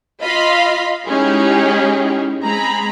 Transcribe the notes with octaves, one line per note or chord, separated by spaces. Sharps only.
F4 D#5 F5 B5 C6
G#3 C#4 D#4 E4 G4 G#4
G#3 C4 G#4 A#5 B5